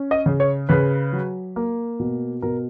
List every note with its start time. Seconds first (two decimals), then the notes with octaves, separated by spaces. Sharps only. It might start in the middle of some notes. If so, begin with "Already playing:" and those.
Already playing: C#4
0.11 D#5
0.26 C#3
0.40 C#5
0.69 C#3 B4
1.13 F#3
1.56 A#3
2.00 B2
2.42 B2 A#4